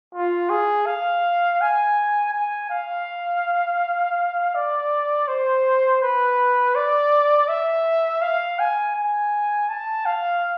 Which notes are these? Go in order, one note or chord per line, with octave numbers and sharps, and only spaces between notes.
F4
G#4
F5
G#5
G#5
F5
D5
C5
B4
D5
E5
F5
G#5
G#5
A5
F5